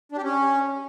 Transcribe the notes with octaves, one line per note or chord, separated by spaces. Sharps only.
D4
G4
C#4